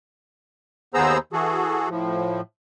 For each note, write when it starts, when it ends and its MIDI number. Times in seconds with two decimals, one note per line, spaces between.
0.94 1.18 39
0.94 1.18 59
0.94 1.18 68
0.94 1.18 72
0.94 1.18 82
0.94 1.18 88
1.33 1.89 52
1.33 1.89 66
1.33 1.89 68
1.33 1.89 69
1.89 2.41 45
1.89 2.41 53